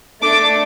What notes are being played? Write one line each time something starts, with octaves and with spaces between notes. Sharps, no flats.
A3 D4 A4 D6